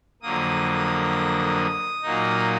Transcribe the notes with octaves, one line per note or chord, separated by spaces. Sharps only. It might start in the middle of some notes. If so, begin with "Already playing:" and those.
F2 D3 F#3 A#3 D#6
A#2 F#3 A#3 D#4